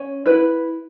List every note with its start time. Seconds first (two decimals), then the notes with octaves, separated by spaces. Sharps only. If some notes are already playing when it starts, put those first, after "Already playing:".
Already playing: C#4
0.26 E4 B4